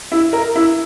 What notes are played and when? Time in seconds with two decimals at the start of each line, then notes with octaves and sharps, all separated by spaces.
0.12 E4
0.33 A#4
0.56 E4